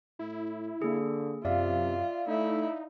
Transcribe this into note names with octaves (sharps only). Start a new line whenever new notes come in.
A2 E4
D3 A#3 G#4
F#2 C3 F4 D5 E5 F5
A3 D#4 E4